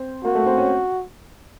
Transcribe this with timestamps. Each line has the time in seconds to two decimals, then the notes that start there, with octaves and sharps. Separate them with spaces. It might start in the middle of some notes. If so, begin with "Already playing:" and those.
Already playing: C4
0.24 A#3 F#4
0.35 A3
0.47 C4
0.58 C#4